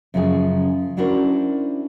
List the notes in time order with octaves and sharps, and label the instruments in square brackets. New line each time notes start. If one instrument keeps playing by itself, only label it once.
[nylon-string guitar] F#2 C#3 F3 F4 G#4
C#4 D4 E4 F#4 A#4 C5